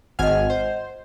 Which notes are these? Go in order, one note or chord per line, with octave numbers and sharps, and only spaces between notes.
G#1 D#5 F#5 G#5 F6
C5